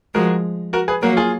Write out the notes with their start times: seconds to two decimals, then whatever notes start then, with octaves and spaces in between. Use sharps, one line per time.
0.14 F3 G#3 F#4 A#4
0.73 F#4 A#4
0.88 G#4 B4
1.02 F#3 A#3 F#4 A#4
1.17 F4 G#4